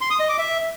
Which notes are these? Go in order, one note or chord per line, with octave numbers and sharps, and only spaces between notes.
C6
D#6
D#5
D6
E5